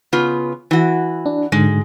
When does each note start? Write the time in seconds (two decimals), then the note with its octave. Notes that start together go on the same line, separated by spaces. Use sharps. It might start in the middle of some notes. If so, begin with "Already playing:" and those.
0.13 C#3 B3 F4
0.71 E3 F#4
1.26 D4
1.52 G#2 D3 G#3